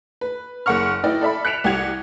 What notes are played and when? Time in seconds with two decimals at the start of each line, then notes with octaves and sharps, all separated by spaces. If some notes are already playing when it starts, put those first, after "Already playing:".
0.21 B4
0.66 F#1 A#3 F#5 C#6 F6
1.04 E4 B4 D5 D#5 G5
1.21 A4 D5 E5 B5
1.45 F#6 B6 C#7 D7 E7 F7
1.64 C2 G4 F#5 G#6 F7